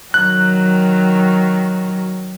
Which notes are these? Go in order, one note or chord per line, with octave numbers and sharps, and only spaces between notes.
D#3 F#3 F#6